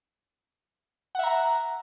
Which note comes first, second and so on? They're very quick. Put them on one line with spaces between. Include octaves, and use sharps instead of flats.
F#5 E5 A#5